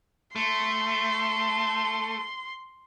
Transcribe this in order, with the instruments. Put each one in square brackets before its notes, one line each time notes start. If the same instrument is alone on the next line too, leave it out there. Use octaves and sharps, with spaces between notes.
[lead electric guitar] A3 [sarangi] C6